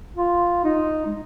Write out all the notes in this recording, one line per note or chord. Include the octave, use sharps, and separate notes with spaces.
F4
D#4
G#3